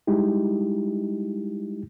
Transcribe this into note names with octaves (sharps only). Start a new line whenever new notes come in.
G3 G#3 D#4 E4 G4